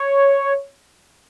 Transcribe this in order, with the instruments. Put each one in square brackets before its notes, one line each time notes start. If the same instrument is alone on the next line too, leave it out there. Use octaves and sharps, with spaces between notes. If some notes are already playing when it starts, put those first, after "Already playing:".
Already playing: [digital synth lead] C#5